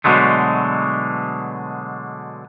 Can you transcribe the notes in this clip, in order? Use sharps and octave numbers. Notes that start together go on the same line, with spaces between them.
B2 D3 F#3 G#3 A3